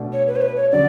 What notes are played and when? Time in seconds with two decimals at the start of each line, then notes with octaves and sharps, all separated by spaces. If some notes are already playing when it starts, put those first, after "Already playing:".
Already playing: B2 A3 D4
0.13 C#5
0.27 B4
0.36 C#5
0.42 B4
0.56 C#5
0.71 D3 F#3 D5